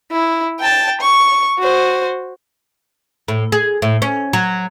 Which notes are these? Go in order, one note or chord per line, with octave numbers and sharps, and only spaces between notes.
E4
G5 A5
C#6
F#4 C5
A2
G#4
A2
C#4
F#3